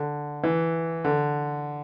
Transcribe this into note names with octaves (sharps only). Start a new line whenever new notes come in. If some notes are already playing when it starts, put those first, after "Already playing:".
Already playing: D3
E3
D3